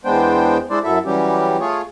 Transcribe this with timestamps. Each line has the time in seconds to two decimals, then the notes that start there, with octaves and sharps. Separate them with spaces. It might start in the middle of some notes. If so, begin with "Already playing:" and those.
0.05 E2 G#3 B3 D4 C5 G5
0.70 G#3 D4 E4 C5 D5
0.84 F#2 F#3 E4 A4 E5
1.05 E3 F#3 G3 C#4 G4
1.60 A3 F4 G#4 C#5